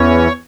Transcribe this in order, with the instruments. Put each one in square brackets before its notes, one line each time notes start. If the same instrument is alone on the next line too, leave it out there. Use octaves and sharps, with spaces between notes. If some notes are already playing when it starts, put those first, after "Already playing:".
Already playing: [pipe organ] E2 E3 C#4 C#5